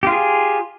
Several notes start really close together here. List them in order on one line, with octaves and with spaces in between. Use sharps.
G4 F4 G#4